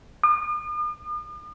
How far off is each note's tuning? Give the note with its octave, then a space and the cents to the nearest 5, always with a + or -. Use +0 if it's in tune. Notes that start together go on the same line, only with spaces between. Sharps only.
D#6 -45